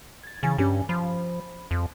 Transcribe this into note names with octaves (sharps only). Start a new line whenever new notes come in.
G#6 A6
C#3 E3 G#5 A6
G2 C#4 G4 G#5
F3 B5
F2